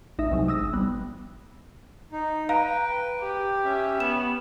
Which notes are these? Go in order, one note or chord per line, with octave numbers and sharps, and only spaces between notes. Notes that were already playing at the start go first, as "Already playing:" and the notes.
A1 D#4 E5
C2 C3 F#3 G#3
D#6 E6 A#6
G#1
G3 B3
D#4
B4 F5 G5 A#5
G4
C#4 E5
B3 E7